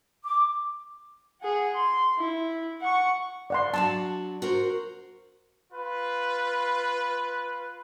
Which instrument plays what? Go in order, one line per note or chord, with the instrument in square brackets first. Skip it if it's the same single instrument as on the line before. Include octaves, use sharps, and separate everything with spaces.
[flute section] D6
[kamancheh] G#4 F#5
C6
E4
F#5 C#6
[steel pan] D5 F#5 C6
[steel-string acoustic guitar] F#3 D4 F#4 [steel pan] A5
[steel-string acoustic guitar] F#4 A#4 C5
[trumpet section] F4 B4